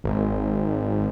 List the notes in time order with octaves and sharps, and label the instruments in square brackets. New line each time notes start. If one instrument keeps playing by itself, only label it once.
[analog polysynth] G#1